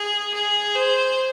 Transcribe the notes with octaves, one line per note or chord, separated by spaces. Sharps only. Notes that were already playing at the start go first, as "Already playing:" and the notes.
Already playing: G#4
G#4
C5